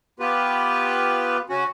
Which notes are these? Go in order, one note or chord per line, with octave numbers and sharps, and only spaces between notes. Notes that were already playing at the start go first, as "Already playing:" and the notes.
B3 F4 G4 B4
C#3 C#4 F#4